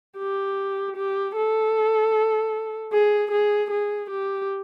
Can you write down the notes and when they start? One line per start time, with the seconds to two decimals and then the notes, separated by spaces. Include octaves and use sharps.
0.18 G4
0.96 G4
1.36 A4
2.93 G#4
3.31 G#4
3.71 G#4
4.10 G4